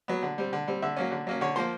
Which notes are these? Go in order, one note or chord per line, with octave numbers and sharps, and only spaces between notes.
F#3 B3
D3
G3 C4
D3
G3 C4
D3 E5
F#3 A#3 C#4
D3
F#3 A#3 C#4
D3 C#5
F3 A#3 C5